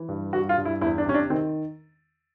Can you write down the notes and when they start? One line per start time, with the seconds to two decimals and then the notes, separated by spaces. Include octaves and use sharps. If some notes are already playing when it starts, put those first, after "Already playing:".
Already playing: E3
0.09 G2
0.33 G2 F#4
0.49 F4
0.57 G2
0.65 E4
0.81 E2 E4
0.98 D4
1.06 C3 C#4
1.14 D4
1.30 D#3 C4